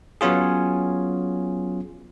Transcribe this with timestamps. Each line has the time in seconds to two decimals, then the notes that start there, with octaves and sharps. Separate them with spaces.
0.21 F#3 B3 C#4 F4 G#4